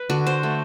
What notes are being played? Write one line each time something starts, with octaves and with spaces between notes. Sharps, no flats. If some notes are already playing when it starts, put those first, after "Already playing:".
Already playing: B4
D3 F#4
C5
A3